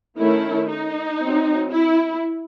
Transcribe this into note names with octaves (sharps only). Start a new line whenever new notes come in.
D#3 A3 C#4 E4
D#4
F#3 C4
E4